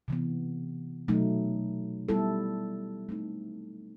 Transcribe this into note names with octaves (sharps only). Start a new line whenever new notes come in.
C3 E3 B3
B2 F#3 A3 D#4
G3 B3 E4 A4
A3 C4 D#4